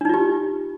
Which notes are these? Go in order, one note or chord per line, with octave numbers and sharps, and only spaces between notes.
D4 D#4 F4 G4